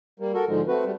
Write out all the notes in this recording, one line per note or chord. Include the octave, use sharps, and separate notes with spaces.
G3 A#3
F#4 A4 A#4
G#2 D3 F3 G#3
A3 C4 F#4 B4
G3 A3